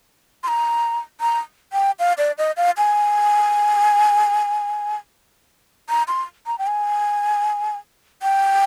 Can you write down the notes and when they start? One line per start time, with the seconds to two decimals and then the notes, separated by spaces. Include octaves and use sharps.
0.43 C6
0.48 A#5
1.21 A#5
1.73 G5
1.99 F5
2.18 D5
2.38 D#5
2.57 F5
2.77 G#5
5.89 A#5
6.08 C6
6.47 A#5
6.58 G5
6.67 G#5
8.23 G5